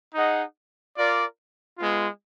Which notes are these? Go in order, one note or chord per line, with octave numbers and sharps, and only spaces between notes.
D#4 G#4 D#5 F#5
F4 A#4 D5
G#3 B3 F4